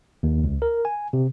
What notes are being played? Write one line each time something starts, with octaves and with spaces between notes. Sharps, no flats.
D#2
C#2
A#4
G#5
C3